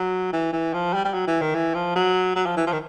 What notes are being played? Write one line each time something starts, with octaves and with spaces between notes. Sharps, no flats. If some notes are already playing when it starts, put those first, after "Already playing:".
Already playing: F#3
E3
E3
F3
G3
G3
F#3
E3
D#3
E3
F3
F#3
F#3
F3
E3
F3
D#3